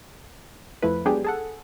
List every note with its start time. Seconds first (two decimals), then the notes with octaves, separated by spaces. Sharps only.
0.82 F2 F3 A3 E4 B4
1.05 F#3 G#3 B3 D4 G4 G#4
1.25 G#4 A4 F#5